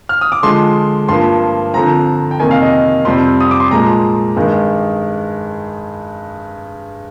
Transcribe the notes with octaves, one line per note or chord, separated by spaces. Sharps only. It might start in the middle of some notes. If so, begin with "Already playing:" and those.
F6
D#6
D6
D3 F3 G#3 C6
G2 F3 A#3 C6
D3 F3 C4 A#5
G5
F2 C3 D#3 A#3 G#5
F5
D#5
F2 C3 G3 C4 C6
D#6
D6
C6
A#2 F3 G#3 A#5
G2 D#3 G#3